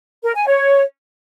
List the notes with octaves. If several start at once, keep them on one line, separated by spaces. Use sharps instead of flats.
A#4
G#5
C#5